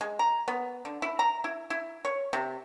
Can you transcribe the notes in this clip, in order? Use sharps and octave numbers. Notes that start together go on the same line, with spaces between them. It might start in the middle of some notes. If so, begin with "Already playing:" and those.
G#3
A#5
B3
D3
E4
A#5
E4
E4
C#5
C3